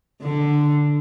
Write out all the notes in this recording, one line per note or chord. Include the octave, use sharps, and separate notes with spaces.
D3